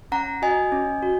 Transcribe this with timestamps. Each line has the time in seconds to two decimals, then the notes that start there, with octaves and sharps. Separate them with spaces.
0.12 C#4 F#5 A#5
0.42 F#4 D#5 G#5
0.72 C#4
1.02 F#4